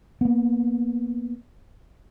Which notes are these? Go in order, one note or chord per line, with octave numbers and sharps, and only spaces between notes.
A#3 B3